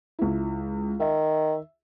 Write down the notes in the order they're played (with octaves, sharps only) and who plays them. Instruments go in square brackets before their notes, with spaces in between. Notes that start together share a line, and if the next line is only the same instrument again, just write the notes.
[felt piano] C#2 E4
[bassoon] D#3 [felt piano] E5